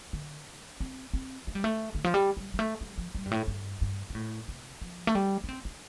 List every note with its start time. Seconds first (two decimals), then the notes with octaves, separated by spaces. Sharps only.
0.13 D3
0.80 C4
1.13 C4
1.47 A3
1.55 G3
1.64 A3
1.95 D3
2.04 F3
2.14 G3
2.37 G3
2.54 G3
2.59 A3
2.81 G3
2.98 F3
3.15 G3
3.26 G2
3.31 A2
3.47 G2
3.81 G2
4.10 C3
4.15 A2
4.48 C3
4.82 F3
5.07 A3
5.15 G3
5.44 D4
5.49 C4
5.65 D4